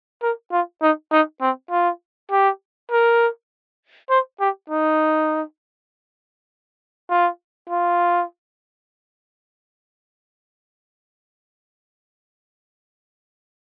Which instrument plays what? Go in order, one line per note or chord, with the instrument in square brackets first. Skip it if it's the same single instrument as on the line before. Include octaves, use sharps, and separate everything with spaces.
[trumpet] A#4
F4
D#4
D#4
C4
F4
G4
A#4
C5
G4
D#4
F4
F4